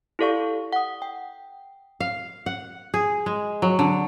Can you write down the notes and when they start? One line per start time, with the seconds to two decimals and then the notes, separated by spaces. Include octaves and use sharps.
0.19 E4 G4 A4 D5 F5 C#6
0.73 F#5 D#6
1.02 G5
2.00 F5
2.46 F#5
2.94 G#4
3.26 G#3
3.62 F#3
3.79 D3